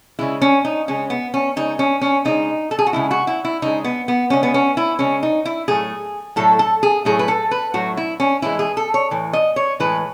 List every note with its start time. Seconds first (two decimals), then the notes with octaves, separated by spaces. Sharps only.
0.19 C#3 G#3 E4
0.42 C#4
0.65 D#4
0.88 C#3 G#3 C#4
1.10 B3
1.34 C#4
1.56 C#3 G#3 D#4
1.79 C#4
2.01 C#4
2.25 C#3 G#3 D#4
2.71 A4
2.79 G#4
2.87 F#4
2.93 C#3 G#3 E4
3.11 F#4
3.27 E4
3.45 E4
3.62 C#3 G#3 D#4
3.84 B3
4.08 B3
4.30 C#3 G#3 C#4
4.43 B3
4.54 C#4
4.77 E4
4.99 C#3 G#3 C#4
5.23 D#4
5.45 E4
5.68 A2 F#3 A3 G#4
6.36 A2 F#3 A3 A4
6.59 A4
6.83 G#4
7.05 A2 F#3 A3 G#4
7.19 B4
7.28 A4
7.51 B4
7.74 A2 F#3 A3 F#4
7.97 E4
8.20 C#4
8.42 A2 E3 G#3 E4
8.59 G#4
8.77 A4
8.94 C#5
9.11 A2 E3
9.33 D#5
9.56 C#5
9.80 A2 E3 G#3 B4